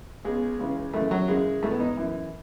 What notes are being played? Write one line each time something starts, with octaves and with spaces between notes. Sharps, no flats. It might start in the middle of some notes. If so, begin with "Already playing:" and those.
C#2 B2 G#3
C#2 C#3 E3
F#2 C#3 E3 A3
F#3
F#2 C#3 E3 G#3
G#2 E3 A3
B3
D#4
F#2 E3